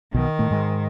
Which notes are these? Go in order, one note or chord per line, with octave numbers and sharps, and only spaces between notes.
B1 B2 D#3
A2 A3
G#2 G#3